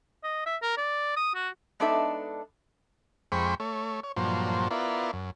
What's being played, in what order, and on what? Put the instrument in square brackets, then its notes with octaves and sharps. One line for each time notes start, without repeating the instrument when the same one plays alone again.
[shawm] D#5
E5
A#4
D5
D#6
F#4
[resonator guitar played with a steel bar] G#3 B3 D4 D#4 A4 E5
[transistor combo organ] F2 G#3 C5 G5 B5 C#6
A3 C#5
C#5
G2 A#2 F3 F#3 C5
B3 E4 F4 A#4 D5
F#2